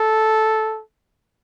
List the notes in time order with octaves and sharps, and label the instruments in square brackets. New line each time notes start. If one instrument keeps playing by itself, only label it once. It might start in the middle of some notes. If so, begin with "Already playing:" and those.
Already playing: [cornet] A4